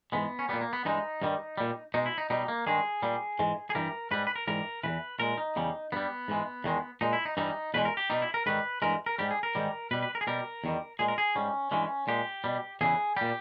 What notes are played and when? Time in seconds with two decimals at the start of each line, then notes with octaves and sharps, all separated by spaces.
0.12 G#2 E3 G#3 B3
0.39 C#4
0.49 A#2 G3 B3
0.61 A#3
0.73 B3
0.85 G2 E3 G#3 D#4
1.22 G2 D#3 G3
1.58 A#2 G3
1.94 B2 G#3 D#4
2.06 E4
2.18 D#4
2.30 B2 G3 D#4
2.48 A#3
2.66 G2 D#3 G#3 G#4
3.02 A#2 G3
3.39 G#2 E3 G#3
3.70 G#4
3.75 G2 E3 G3 A#4
4.11 G#2 G3 B4
4.27 B4
4.36 A#4
4.47 G#2 E3 G3 A#4
4.83 E2 C#3 E3 B4
5.20 A#2 G#3 A#4
5.38 D#4
5.56 E2 C#3 G3
5.92 G2 G3 B3
6.28 G#2 E3 G#3
6.64 E2 D#3 G#3
7.01 A#2 G#3 D#4
7.13 E4
7.25 D#4
7.37 G2 E3 G3 D#4
7.74 E2 B2 G#3 B4
7.85 A#4
7.97 G4
8.10 B2 G3 D#4
8.22 E4
8.34 A#4
8.46 G#2 D#3 G3 B4
8.82 G2 E3 G#3 A#4
9.06 A#4
9.19 G#2 G3 G4
9.31 G#4
9.43 A#4
9.55 G#2 D#3 G3
9.91 B2 G3 B4
10.02 B4
10.15 A#4
10.21 G#4
10.27 B2 G3 A#4
10.64 E2 D#3 G3
10.99 A#2 G#3 G#4
11.08 A#4
11.18 G#4
11.35 G#2 G3 C#4
11.71 G2 E3 G#3 C#4
12.08 A#2 G#3 G4
12.44 B2 G3
12.81 E2 C#3 E3 G#4
13.16 A#2 G3 G4